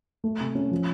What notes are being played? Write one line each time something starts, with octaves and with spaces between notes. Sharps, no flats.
A3
C3
C#4
F3